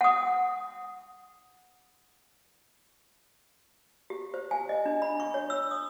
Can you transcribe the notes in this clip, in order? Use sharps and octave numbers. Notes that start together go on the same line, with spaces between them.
F#5 D#6
G4
C5
G#5
D#5
D4
B5
C#6
C#5
E6
D#6